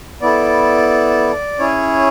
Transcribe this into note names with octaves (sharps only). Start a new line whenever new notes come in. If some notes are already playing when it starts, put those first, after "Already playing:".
B3 E4 A4 D5
C#4 E4 G#4 C#5